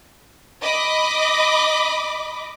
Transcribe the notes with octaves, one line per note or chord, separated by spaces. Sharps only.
D#5 B5 D6